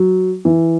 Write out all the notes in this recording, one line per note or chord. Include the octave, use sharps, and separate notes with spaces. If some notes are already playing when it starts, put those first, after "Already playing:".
Already playing: F#3
E3